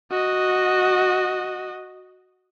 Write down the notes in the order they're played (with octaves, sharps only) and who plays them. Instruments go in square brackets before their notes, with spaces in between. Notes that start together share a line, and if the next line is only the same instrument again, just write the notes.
[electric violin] F#4 D#5